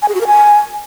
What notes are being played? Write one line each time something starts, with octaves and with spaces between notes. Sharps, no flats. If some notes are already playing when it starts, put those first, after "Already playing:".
G#5
G#4
F#4
A#4
G#5